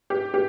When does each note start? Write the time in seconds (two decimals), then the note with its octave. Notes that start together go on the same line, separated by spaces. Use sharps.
0.10 G4
0.34 G4